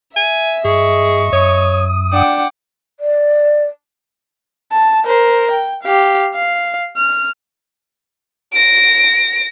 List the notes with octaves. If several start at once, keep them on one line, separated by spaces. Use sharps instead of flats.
E5 G#5
G2 G#4 D#5 C#6
F#2 C#5 D#6
D4 F#5 G5 D6
D5
A5
A#4 C5
G5
G4 F5
F5
F6
A#6 D7